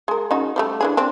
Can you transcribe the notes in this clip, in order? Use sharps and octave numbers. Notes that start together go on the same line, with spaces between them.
G#3 A#4
C#3 D#4 F#4
F3 G3 A3
E3 D4 G#4
C4 D4